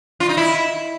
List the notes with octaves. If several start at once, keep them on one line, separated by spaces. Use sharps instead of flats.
F4
D#4
E4